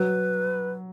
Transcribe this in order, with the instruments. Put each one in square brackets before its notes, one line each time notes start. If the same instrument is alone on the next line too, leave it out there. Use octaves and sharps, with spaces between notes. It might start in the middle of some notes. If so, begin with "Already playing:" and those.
Already playing: [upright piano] F#3 [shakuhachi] B4